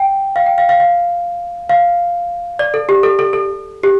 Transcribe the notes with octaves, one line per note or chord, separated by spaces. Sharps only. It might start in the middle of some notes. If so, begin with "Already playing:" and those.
Already playing: G5
F5
G5
F5
F5
F5
F5
D5
A4
G4
A4
A4
A4
G4